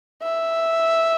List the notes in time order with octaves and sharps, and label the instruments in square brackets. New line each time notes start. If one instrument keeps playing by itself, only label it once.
[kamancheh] E5